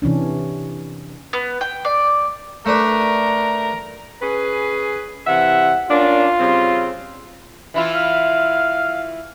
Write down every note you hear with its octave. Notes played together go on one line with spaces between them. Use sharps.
C3 E3 C#4 D4
B3
G5
D5
A3 D4 A#4 B4
C#4 G#4 B4
C3 E3 E5 F#5
A#3 C#4 D4 F4
C#3 G3 C4
E3 E4 F4
F5